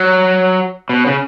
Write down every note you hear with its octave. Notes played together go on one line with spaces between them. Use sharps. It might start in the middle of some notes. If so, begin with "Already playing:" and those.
Already playing: F#3
B2
C#3